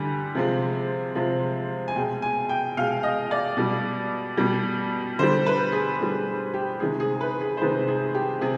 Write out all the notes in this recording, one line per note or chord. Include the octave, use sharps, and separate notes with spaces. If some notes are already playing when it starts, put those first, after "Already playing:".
Already playing: D3 G3 G#5
C3 F3 G#3
C3 F3 G#3
G#5
B2 G#3 G5
G#5
G5
B2 G#3 F5
D#5
D5
B2 G3
B2 G3
D3 G3 C5
B4
G#4
D3 G3
G4
C3 D#3 G#3 G#4
G#4
B4
G#4
C5
C3 D#3 G#3 B4
G#4
G4
C3 G#4